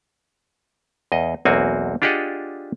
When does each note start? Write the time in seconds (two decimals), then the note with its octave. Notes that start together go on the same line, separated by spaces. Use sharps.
1.12 E2 D#5
1.45 B1 E2 A#3 C4 F#4 G#5
2.02 D4 F4 G4 G#4 D#5 F#5